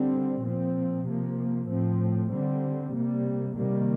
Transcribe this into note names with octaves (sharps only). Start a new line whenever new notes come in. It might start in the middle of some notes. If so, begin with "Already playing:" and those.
Already playing: D3 G3 C4
A#2 F3 C4
C3 F3 A#3
A2 F3 C4
D3 G3 C4
C3 G3 A#3
C3 D#3 G3 A#3